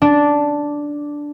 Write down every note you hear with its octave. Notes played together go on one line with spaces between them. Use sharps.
D4